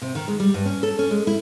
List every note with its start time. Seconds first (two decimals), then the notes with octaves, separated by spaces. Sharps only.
0.02 C3
0.15 D#3
0.28 G#3
0.40 G3
0.54 G2
0.66 C#4
0.83 A4
0.99 C#4
1.11 G#3
1.27 E4